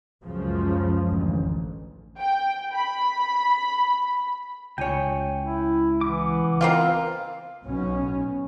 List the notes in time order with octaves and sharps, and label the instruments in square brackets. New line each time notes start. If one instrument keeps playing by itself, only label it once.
[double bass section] C#2 F#2 C#3 F3
A1 D2
[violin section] G5
B5
[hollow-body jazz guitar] C#2 C#5 [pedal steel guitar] G5 G#5
[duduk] E4
[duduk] E3 [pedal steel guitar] B3 D6
[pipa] A#3 C4 F4
[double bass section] B1 B2 C#4